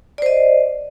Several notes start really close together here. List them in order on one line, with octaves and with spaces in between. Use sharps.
D5 C5 D#5